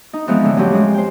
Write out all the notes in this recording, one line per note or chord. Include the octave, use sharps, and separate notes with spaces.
D#4
E3 F3 G#3 B3 C4 D#4
A2 D3 C#4
F2 F3 F#3 A3 C#4 G4
G#3 C4
C5 G5